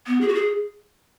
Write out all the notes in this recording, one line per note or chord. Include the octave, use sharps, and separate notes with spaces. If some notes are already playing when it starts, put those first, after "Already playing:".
B3
G#4
F#4
G#4